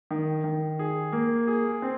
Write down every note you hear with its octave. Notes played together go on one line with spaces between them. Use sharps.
D#3
D#3
G#4
A#3
G#4
C4